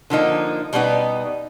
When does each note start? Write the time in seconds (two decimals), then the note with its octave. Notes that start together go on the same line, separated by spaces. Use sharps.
0.10 D3 F3 A#3 D#4
0.73 B2 G3 B3 D#4